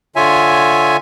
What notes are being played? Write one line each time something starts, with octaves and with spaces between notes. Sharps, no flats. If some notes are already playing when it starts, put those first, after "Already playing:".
D3 F4 C#5 E5 G#5